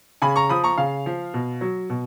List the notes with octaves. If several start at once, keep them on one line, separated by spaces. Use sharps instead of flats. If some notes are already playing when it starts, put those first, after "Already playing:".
C#3 G#5 B5
A#5 C#6
F3 B5 D#6
A#5 C#6
C#3 F5
F3
B2
F#3
B2